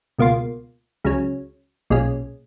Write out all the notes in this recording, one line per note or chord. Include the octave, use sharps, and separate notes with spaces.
C#2 B2 A#3 F4
C#2 C#3 F#3 C#4
B1 A#2 G#3 C#4